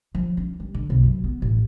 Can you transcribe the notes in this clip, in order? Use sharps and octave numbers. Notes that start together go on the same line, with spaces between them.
F3
C#4
G3
D3
B1
F#2
B3
A1